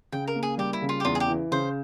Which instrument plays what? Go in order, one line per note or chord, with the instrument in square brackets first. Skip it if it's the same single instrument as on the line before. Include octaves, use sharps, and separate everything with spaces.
[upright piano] C#3 [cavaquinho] G5
[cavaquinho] A#4
[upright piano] A#3
[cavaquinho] G#4
[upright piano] G3 [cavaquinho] G4
[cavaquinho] E4
[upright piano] C#3
[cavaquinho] F4
G4
[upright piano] E2 [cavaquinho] F4
[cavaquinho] G#4
G4
[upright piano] E3
[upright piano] C#3 [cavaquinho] C5